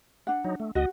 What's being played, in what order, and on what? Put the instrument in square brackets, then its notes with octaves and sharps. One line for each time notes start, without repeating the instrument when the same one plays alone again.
[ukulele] D4 F#5
[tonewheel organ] F#3 D#4
A3
[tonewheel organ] D2 D#5 [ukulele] F#4